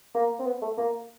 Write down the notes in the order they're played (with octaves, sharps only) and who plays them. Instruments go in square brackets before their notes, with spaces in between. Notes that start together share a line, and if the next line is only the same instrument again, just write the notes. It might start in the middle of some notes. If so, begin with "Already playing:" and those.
[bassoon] A#3
C4
B3
A3
A#3